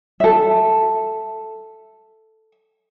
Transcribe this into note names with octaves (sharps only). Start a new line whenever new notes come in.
A4 E5